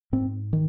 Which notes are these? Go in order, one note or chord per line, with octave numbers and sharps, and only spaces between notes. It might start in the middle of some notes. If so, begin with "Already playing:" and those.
G#2 C4
D#3